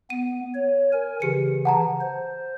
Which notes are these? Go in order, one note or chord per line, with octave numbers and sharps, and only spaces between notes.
B3 D#7
C#5
A#4 G#5
C#3 E3 G4 C#7
F#5 A5 A#5
C5